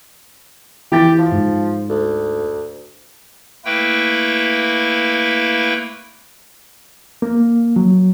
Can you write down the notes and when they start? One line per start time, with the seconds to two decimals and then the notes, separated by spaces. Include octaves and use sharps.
0.92 E3 G4 A6
1.18 F3
1.32 G#2
1.89 D2
3.65 A3 A#3 E4 B4 G5
7.22 A#3
7.76 F#3